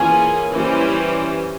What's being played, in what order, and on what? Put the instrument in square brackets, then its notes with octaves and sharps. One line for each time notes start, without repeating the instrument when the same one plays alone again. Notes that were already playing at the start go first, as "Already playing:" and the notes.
Already playing: [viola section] E3 A#3 C#4 F4 G#4 [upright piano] G#5
[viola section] E3 G3 C#4 G4 C5